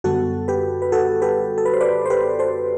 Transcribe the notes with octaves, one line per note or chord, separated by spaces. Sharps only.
F#2 D3 G3 B3 F#4 A4
G4 B4
B4
F#4 A4
G4 B4
A4
B4
C5
B4 D5
C5
G4 B4
A4 C5